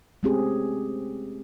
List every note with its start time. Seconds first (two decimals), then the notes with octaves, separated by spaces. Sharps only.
0.23 G#3 A3 C4 C#4 G4 G#4